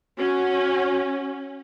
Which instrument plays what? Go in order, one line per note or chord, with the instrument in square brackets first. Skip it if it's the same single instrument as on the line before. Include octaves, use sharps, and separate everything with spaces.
[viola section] C#4 [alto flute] F#4